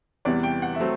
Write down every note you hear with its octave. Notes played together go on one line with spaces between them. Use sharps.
E2 C3 E3 G3 B3 D5
G5
F#5
E5
F#3 A3 C4